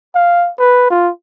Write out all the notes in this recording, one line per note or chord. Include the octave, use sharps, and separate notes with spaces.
F5
B4
F4